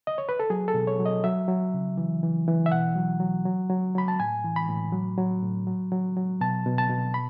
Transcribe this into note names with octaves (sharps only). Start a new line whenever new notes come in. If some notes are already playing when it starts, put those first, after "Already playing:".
D#5
C#5
B4
A4
F#3 G#4
A4
B2
C#5
F#3
D#5
F#3 E5
F#3
C#3
E3
E3
E3
E5
B2 F#5
F#3
F#3
F#3
F#3
F#3 B5
A5
A2 G#5
E3
B5
A2
F#3
F#3
A2
F#3
F#3
F#3
B2 A5
B2
A5
B2
B5